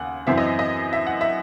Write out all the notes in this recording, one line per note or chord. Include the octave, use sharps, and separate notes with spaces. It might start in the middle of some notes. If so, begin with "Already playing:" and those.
Already playing: D#2 C#3 F#5 G#5
F#2 E3 C4 E5
D#5
D#5
E5
F#5
E5